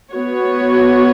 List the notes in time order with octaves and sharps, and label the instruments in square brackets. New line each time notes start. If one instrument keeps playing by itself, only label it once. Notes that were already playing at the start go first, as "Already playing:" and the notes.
[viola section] B3 F#4 C#5